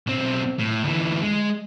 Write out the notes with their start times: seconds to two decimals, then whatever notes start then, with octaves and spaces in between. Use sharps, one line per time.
0.07 B1 C4
0.59 A2
0.83 D2 E3
1.23 G#3